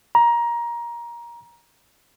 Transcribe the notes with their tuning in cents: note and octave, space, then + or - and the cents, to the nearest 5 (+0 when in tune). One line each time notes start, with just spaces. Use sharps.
A#5 +20